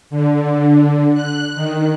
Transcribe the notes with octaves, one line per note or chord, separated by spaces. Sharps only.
D3
F#6
D#3